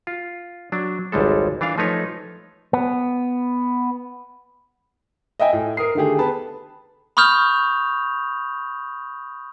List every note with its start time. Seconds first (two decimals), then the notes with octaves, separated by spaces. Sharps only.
0.07 F4
0.72 F#3 D4
1.12 G#1 C#2 G3 G#3 A4
1.61 E3 D4 F4 F5
1.78 F3 A3 D#4 B4 C#5
2.73 B3
5.40 D#5 E5 G5 G#5
5.53 A2
5.77 A#4 D#6 C7
5.95 D3 D#3 A3 G4 G#4
6.19 B3 A5 B5
7.17 B5 C#6 D#6 F6 G6 F7